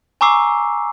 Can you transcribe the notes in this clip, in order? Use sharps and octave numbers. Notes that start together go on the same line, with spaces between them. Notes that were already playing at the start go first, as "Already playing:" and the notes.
G#5 A#5 C#6 D6 E6 C7